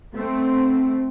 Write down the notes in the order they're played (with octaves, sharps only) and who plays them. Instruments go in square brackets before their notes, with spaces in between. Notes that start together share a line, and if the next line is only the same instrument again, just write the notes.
[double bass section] A3 C4